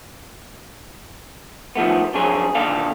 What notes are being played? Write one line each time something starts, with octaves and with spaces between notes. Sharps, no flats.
D#3 F3 A3 B3
F2 F#3 C4 D4 G#4 C#5
D#2 A#2 D3 D4 A4 F5